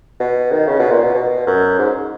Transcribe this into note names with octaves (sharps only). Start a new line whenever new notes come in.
B2
D#3
C#3
B2
A#2
B2
B2
F#2
G#2